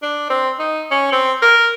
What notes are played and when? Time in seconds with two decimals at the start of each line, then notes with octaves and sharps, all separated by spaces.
0.03 D4
0.30 C4
0.59 D#4
0.91 C#4
1.12 C4
1.42 A#4